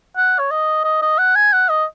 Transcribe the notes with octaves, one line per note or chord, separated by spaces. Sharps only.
F#5
C#5
D#5
D#5
D#5
F#5
G#5
F#5
D#5